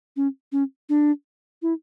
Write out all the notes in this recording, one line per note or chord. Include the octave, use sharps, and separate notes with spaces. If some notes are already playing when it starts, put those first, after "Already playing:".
C#4
C#4
D4
E4